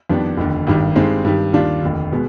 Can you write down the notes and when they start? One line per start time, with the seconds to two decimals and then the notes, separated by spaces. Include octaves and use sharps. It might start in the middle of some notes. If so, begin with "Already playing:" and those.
0.10 F2 D#3 G3 B3 D4
0.37 F1 D#2 D3
0.67 G#1 G2 D#3 G3
0.96 G2 D#3 G#3 C4 D#4
1.25 G2 D#3 G3
1.53 D#2 D#3 G3 D4 F4
1.83 F1 D#2 D3
2.12 B2 G#3 B3